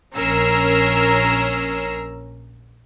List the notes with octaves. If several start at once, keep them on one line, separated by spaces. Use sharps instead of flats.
A#1 C#4 A#4 A#5 E6 C7